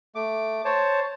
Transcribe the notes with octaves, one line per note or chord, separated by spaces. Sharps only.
A3 D6
C5 C#5 A5